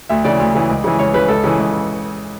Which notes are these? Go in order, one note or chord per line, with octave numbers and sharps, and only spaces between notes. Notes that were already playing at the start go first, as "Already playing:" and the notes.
D2 E5
C#3 E3 D5
D2
C#3 E3
C#2
C#3 E3
C#2 C#5
C#3 E3 B4
C#2 A4
C#3 E3
C#2